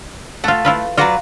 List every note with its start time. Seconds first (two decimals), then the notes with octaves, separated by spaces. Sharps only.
0.44 A3 F4 F#5
0.65 E4 F4 B4
0.97 F#3 F4 F#4 B4 D5 A#5